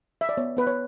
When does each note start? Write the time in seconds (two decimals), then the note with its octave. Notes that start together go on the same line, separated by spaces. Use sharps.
0.21 E5
0.29 D5
0.37 B3 C#5
0.57 B3 B4
0.67 C#5